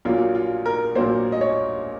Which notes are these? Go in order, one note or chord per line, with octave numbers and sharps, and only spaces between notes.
A#1 A#2 F#3 A#3 F4
F4
A#4
A#1 A#2 F#3 A#3 C5
D#5
C#5